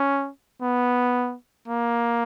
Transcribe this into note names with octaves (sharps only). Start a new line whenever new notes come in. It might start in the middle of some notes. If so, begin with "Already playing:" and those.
Already playing: C#4
B3
A#3